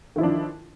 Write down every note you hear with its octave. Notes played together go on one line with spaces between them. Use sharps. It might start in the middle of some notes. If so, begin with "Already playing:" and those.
D#3 F3 D4 E4